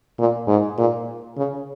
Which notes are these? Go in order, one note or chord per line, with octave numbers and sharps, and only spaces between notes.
A#2
G#2
A#2
C#3